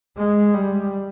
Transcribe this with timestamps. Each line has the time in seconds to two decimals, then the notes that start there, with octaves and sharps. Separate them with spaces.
0.17 G#3
0.54 G3